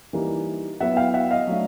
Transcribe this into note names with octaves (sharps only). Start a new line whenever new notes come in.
E3 G3 A#3 D#4
F#3 B3 E4 E5 F#5
F5 G5
E5 F#5
D#5 F5
F#3 A3 D4